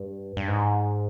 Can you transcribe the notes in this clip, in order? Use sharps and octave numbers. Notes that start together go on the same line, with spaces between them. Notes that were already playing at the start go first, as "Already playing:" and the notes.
Already playing: G2
G2
G#2